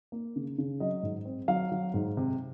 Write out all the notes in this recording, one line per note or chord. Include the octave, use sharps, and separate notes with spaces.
A#3
C#3
C#3
F#3 D#5
G#2
C4
F#3 F5
F#3
G#2
C3